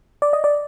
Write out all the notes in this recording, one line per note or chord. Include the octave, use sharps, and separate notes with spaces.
D5
D#5
D5